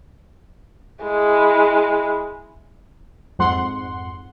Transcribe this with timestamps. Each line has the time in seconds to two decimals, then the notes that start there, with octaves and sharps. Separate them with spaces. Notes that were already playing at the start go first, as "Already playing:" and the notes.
1.03 G#3 E4
3.39 F2 G#2 F#5 C6